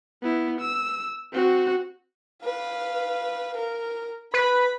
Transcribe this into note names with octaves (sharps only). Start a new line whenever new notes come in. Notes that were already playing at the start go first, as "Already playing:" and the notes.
B3 E4
E6
C4 F#4
B4 F5
A#4
B4 B5